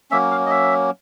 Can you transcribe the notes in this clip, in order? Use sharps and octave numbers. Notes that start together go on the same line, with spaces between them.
F#3 A#3 C#4 E5
F5
D#5
E5